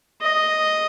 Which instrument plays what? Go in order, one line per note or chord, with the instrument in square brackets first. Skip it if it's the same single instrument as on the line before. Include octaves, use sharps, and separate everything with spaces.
[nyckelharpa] D#5